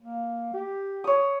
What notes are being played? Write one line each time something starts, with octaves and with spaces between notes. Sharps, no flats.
A#3
G4
C#5 D#6